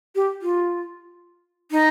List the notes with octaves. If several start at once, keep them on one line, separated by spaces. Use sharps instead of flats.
G4
F4
D#4